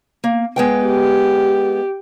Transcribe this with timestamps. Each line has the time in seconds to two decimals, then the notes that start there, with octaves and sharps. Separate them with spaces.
0.24 A#3
0.56 G#3 B3 G5
0.86 G4